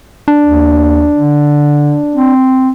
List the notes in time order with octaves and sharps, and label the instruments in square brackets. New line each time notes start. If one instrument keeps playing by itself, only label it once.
[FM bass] D4
[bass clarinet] D#2
D3
C4